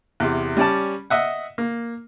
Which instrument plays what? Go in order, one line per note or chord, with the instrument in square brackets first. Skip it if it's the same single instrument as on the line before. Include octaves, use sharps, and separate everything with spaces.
[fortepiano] E2 C3
G3 C#4 D5 A5
D#5 E5 F#5
A#3